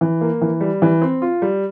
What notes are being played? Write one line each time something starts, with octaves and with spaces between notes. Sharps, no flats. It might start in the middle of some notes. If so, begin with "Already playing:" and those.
E3
A#3
E3
G3
E3
C4
F4
G3